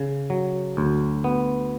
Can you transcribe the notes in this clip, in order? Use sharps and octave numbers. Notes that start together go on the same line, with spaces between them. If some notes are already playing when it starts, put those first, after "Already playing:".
Already playing: C#3
F#3
D2
B3